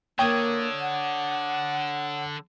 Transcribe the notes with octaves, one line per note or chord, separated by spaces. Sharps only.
D3 A#3 C#5 G5 D#6 G#6
F#5